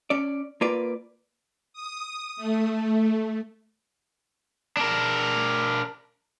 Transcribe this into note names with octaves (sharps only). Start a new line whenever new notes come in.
C#4 D5
A#3 F4 B4 D5
D#6
A3
D4 A#4